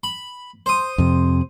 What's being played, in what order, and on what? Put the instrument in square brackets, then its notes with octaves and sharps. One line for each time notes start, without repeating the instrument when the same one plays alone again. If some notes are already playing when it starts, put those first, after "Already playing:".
[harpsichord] B5
C5 D#6
[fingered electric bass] F2 C3